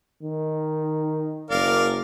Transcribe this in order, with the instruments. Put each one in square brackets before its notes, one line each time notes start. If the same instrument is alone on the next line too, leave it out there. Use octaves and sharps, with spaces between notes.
[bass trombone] D#3
[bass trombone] F#1 [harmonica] A#4 D5 F5